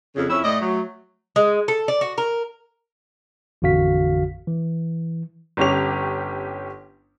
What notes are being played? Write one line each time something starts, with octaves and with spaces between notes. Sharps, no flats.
F2 C#3
F2 C#4 E4 E6
A2 A3 D5 D#5
F#3
G#3
A4
D5
F#4
A#4
A1 F2 D3 F#4 F5 B6
E3
G1 C#4 G4 F7